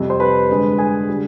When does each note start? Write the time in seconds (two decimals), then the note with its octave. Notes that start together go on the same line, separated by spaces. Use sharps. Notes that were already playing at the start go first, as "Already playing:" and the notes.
Already playing: F2 C3 G3
0.10 C5 C6
0.20 B4 B5
0.49 G2 D3 G#3
0.78 G#4 G#5
1.08 D3 G3